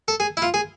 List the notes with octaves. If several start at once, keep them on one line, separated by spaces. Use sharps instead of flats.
A4
G#4
E4
F4
G#4